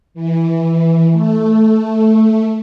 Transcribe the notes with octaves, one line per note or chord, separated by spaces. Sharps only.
E3
A3